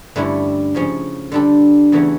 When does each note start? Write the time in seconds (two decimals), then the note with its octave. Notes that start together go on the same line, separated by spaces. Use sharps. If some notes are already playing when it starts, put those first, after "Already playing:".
0.16 G2 D3 A3 C#4 E4
0.75 C#3 F3 C#4
1.32 D3 G3 D4 A4
1.92 E2 C#3 E3 A3 C#4